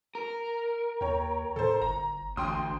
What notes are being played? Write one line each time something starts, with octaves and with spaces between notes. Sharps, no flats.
A#4
D#2 C#5 G5
A2 A4 C5
G1 A#5
A1 D2 G5 C6 D#6